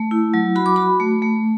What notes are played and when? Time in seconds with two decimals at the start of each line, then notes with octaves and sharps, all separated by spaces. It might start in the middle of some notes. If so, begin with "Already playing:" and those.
Already playing: A3
0.11 E4
0.34 F#3
0.55 F#4 B5
0.66 D6
0.76 F#4 B5
1.00 A3
1.22 A3